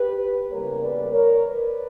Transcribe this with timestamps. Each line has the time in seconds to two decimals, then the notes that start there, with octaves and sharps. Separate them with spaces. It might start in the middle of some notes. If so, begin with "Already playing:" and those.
Already playing: G4 B4
0.51 E2 C#3 G3 A#3 A#4 C#5
0.81 B4 D5
1.12 A#4 C#5
1.42 B4 D5